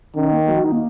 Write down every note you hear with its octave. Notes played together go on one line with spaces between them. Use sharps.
D#3 C#4
A#3
F#3
F#4
D#4
A#3